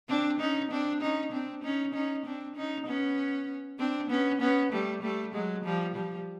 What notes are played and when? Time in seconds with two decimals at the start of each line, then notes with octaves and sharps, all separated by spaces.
0.09 C4 D4
0.40 C#4 D#4
0.71 C4 D4
1.01 C#4 D#4
1.32 C4 D4
1.63 C#4 D#4
1.94 C#4 D#4
2.25 C4 D4
2.56 C#4 D#4
2.86 B3 C#4
3.79 C4 D4
4.10 B3 C#4
4.41 B3 C#4
4.72 G3 A3
5.02 G3 A3
5.34 F#3 G#3
5.64 F3 G3
5.95 F3 G3